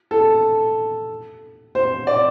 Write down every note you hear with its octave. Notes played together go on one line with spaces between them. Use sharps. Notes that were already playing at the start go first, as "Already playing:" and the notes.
A4
C5
D5